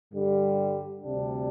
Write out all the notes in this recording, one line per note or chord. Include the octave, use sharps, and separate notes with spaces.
G2 D3 G3
D2 C3 G3 D4